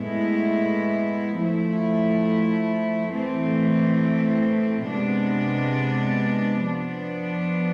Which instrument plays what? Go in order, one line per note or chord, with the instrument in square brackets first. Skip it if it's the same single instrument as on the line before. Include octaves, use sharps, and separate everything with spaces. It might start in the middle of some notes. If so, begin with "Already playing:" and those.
Already playing: [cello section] A2 G#3 B3 E4
F3 A3 E4
A2 E3 A3 C4
C3 G#3 B3 D4
F3 B3 D4